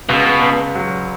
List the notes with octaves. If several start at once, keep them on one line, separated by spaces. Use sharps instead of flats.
C#2 B2
C#2
F#3